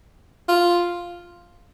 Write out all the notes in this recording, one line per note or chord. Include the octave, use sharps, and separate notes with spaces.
F4